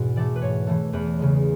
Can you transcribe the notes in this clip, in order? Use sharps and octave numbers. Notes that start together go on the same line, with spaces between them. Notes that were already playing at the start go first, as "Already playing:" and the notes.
Already playing: E2 G#2 B2
E3 A3 D5
B4
G#2 C#5
E3 A3
E2 B4
C#3 G#3